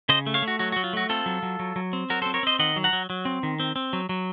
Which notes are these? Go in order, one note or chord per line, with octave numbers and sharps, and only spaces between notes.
C#3 C5 D#5
A3
C#5 F5
A3
F#4
F#3 F#4
F#4
F#3
F4
A3 F#4
C4 F4 A4
F#3
F#3
F#3
F#3
C4
F#3 F#4 A#4
A4 C5
C4
A#4 C#5
C4 C5 D#5
D#3 D#5 F#5
F#3
F#5 A#5
F#3
F#3
C4
D#3
C4
C4
F#3
F#3